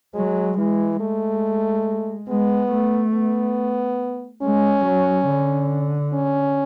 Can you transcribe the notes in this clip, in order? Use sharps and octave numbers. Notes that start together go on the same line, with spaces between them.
F#3 G#3
E3 G#3
G#3 A3
G#3 B3
A3
B3
G#3 C#4
F#3
D3
C#4